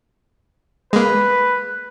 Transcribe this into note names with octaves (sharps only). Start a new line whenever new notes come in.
G#3 A#3 B4